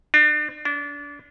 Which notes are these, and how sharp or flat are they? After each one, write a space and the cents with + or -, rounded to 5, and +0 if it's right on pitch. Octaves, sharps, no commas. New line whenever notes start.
D4 +35
D4 -30